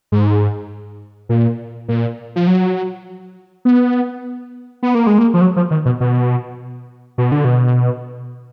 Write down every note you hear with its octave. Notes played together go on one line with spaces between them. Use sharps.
G#2
A#2
A#2
F3
F#3
B3
B3
A#3
G#3
A#3
F3
F#3
F3
D#3
B2
B2
B2
D3
B2